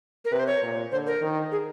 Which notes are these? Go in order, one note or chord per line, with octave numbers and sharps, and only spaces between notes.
A#4
C3 B4
C5
C#5
A#2
D3 C5
A#4
D#3
G#4